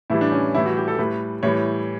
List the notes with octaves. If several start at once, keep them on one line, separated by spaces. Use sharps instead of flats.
A2 E3 G3 E4
D4
C#4
A2 E3 G3 E4
F#4
G4
A4
A2 G3 B4
A2 E3 G3 C#5